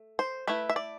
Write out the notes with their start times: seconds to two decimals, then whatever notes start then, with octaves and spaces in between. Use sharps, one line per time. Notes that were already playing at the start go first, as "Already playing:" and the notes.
Already playing: A3
0.19 C5
0.47 A3 E4 B4
0.69 E5
0.76 D5